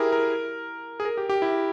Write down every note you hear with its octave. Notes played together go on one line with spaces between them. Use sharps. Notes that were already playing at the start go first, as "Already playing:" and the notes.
Already playing: E4 G4 G#4 A#4
A#4
G#4
A#4
G4
G4
E4